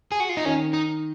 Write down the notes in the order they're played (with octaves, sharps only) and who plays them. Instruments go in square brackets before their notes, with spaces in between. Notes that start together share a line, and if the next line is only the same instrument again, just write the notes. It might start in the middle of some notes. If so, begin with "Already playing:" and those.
[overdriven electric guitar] G#4
F#4
F4
D#4
[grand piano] D#3 [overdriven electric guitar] C#4
[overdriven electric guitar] D#4